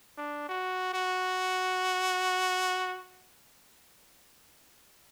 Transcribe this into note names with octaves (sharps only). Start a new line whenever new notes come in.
D4
F#4
F#4